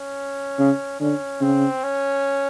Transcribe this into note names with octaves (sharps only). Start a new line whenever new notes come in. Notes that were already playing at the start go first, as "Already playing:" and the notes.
Already playing: C#4
C#3
D3 C#4
C#3 C4
C#4